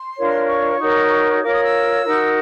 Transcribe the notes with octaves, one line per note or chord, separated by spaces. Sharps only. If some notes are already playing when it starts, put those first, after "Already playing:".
Already playing: C6
D4 F4 A#4 C#5
C#6
D#4 F#4 A#4 C#5
F4 A#4 C#5 D6
D#6
E6
D#4 F#4 A#4